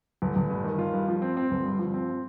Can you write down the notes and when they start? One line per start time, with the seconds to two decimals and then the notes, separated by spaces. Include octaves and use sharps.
0.22 G1
0.36 G1
0.50 G2
0.64 D#3
0.78 F4
0.93 G2
1.08 F3
1.22 C4
1.37 C4
1.51 G1
1.65 G2
1.79 F3
1.94 C4